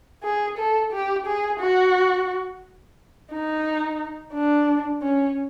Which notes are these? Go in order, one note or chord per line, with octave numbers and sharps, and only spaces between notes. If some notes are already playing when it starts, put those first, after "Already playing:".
G#4
A4
G4
G#4
F#4
D#4
D4
C#4